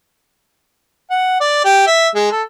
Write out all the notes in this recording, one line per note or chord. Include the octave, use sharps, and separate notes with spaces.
F#5
D5
G4
E5
G#3
A4